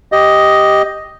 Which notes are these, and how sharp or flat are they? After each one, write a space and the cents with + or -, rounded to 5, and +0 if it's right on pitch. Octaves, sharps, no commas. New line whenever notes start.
G4 +0 D#5 +5